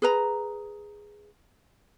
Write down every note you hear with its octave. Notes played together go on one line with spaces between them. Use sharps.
G#4 B4 A#5